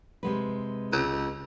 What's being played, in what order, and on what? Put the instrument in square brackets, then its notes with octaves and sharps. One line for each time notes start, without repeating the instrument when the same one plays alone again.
[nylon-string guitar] C3 G#3 B4
[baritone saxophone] C#2